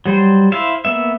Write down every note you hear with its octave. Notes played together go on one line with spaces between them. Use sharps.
F#3 G3 C5
E4 C5 E5 F5
A#3 B3 E5